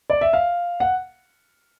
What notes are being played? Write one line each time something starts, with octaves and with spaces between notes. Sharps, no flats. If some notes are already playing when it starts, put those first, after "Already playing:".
D5
E5
F5
F#5